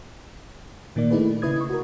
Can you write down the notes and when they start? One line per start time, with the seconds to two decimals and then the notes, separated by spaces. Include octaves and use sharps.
0.96 A#2 D#3 A#3 D5
1.11 A3 D#4 E4 G#4 B4
1.25 D#4
1.42 C#3 E4 B4 D#6 G#6
1.56 D#4 C#6
1.69 F#4 A#4